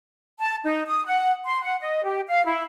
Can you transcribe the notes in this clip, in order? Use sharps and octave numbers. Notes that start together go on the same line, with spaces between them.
A5
D#4
D#6
F#5
C6
F#5
D#5
G4
F5
E4